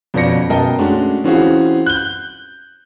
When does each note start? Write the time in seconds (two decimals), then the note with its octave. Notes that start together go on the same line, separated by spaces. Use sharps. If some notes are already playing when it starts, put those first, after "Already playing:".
0.14 F2 B2 C#4 D5 A#6 C#7
0.50 F#2 B2 A#4 D#5 G5 A5
0.79 G#3 A3 C#4 D4 F#4
1.24 E3 C4 C#4 F4 F#4 G#4
1.86 F#6 G6 G7